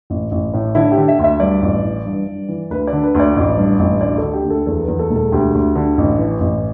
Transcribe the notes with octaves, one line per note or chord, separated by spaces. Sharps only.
A1
A1
A2
D3 E4
G4
D3
E5
D2
E5
G2 D5
A1
E3
G2
G2
E3
D2 B4
D5
D3
B4
D2
D5
A1
G2
A1
D2 D5
D3 A4
G4
D2
A4
E2 A4
E2 B4
A4
E1
A4
D2 G4
D2
D3
A1
E3
A1